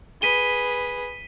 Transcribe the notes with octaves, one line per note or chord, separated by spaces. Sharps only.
G#4 B4 B6 D#7 G7